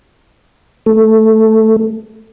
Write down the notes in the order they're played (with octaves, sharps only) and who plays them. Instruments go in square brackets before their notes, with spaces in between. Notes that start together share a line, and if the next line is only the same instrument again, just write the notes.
[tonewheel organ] A3